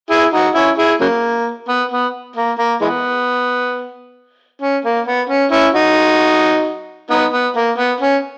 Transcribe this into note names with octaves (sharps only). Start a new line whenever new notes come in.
E4 G#4
D#4 F#4
C#4 E4
E4 G#4
C#3 F#3 A#3
B3
B3
A#3
A#3
E3 G#3 B3
C#4
A#3
B3
C#4
C#4 E4
D#4 F#4
B3 D#4
B3
A#3
B3
C#4